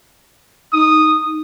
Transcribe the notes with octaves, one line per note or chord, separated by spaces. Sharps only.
D#4 D#6